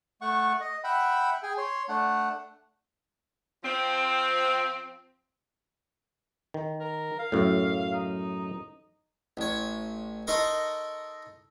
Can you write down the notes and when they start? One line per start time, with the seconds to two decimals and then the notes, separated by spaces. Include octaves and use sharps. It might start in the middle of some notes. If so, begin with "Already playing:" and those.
0.21 A3 F#5 C#6
0.61 D#5
0.84 E5 F#5 G5 B5
1.43 G#4 G5 G#5
1.58 C#5 C6
1.89 A3 D4 F#5
3.64 F3 C4
6.54 D#3
6.80 A#4
7.19 F5
7.32 F#2 A2
7.93 D#4
9.37 A1 C#5
10.27 D#4 A4 A#4 D#5 C6 C#6